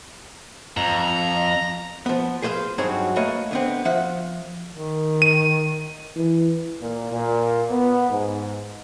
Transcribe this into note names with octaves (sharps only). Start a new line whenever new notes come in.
F2 A#5
F3 B3
G#4 B4 C5 D5 F5
G2 F#3 C4 D#4 F#4 G#4
A3 A#3 B4 C#5 D#5
D3 B3 C4
F3 E5 F#5
D#3
D#7
E3
A#2
A#2
B3
G#2